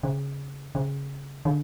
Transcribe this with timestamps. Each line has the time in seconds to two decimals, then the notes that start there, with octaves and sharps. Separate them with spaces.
0.03 C#3
0.75 C#3
1.45 D3